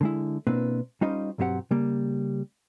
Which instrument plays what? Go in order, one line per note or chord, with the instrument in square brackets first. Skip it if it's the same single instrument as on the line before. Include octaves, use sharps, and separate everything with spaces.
[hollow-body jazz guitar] D3 G#3 E4
B2 A#3 C4 D4 E4 B4
G3 C#4 D#4 F4 C5 D#5
B1 G2 F#3 C4 G4 F#5
C#3 G3 A#3